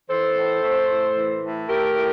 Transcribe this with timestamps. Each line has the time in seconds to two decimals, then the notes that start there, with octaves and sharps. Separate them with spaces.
0.09 E3 A4 C5
0.36 A2
0.63 A3
0.89 A2
1.16 E3
1.43 A2
1.69 A3 G4 A#4
1.96 A2